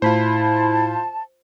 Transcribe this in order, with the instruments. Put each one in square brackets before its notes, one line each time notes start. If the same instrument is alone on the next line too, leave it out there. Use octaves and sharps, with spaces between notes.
[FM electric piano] A2 B5 [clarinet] E4 [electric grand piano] F4 C5 [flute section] A5